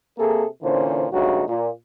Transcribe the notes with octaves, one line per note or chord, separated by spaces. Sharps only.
C3 A#3 G#4 A4
A#2 D3 E3 C#4 C5
D2 G2 C#3 F#3 D#4 F#4
A#2